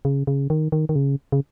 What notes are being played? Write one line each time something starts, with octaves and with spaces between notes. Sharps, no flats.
C#3
C#3
D#3
D#3
D#3
C#3
C#3